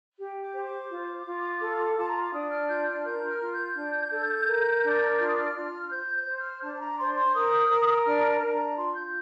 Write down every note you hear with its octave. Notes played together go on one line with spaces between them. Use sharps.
G4
D6
C5
D6
F4
F4
A4
F4 A5
A#5
C6
D6
D4 D#6
F6
F4 G6
F6
A#4 G6
F6
F4
G6
D4
A4
A#4
D4
F4 F6
D#6
F6
F4
C5 G6
G6
C5
G6
F6
D4 A5
A5
A#5
C5 C6
C6
A#4 D#6
A#4
D#6
D4 F6
A5
D4
A#5
F4 C6
G6